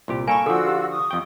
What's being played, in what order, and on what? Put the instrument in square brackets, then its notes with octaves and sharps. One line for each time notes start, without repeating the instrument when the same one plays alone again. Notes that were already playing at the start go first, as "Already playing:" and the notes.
[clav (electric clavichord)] C2 A#2 G4
[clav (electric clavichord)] A#3 A4 [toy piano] G#5 B5 [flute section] C#6
[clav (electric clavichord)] D3 F3 [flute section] F4 F#4 E6 [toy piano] A4
[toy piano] G4
[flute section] C#6 D#6
[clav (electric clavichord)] F2 G5